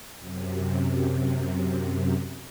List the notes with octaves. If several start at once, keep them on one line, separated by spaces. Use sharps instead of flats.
F#2 C3